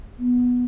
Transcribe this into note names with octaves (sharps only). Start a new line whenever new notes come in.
B3